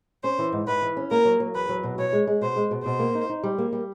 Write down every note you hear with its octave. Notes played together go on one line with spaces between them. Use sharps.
C#4 C5
E3
G#2
G#2 B4
E3
C#4
A#3 A#4
F#3
F#3
E2 B4
F#3
B2
B2 C#5
G#3
G#3
B2 C5
G#3
B2
B2 C5
A#3
D#4
D#4
G3
A#3
G3